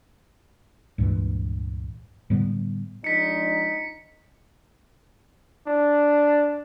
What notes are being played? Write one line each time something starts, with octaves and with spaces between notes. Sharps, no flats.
C#2 G2 A#2 E3
A2 D3 G3 B3
F3 G#3 D4 D#4 B6 C#7
D4